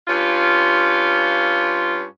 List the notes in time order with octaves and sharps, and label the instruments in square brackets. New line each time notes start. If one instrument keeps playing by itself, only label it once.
[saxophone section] G2 C#4 F4